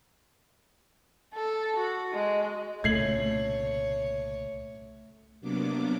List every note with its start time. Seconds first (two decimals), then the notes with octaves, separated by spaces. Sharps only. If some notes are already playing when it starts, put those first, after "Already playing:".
1.34 A4
1.76 F#4
2.13 G#3
2.84 C2 A#2 C#3 A3 C#5 G#6 C7 F#7
5.40 C3 F#3 A#3 B3 D4 D6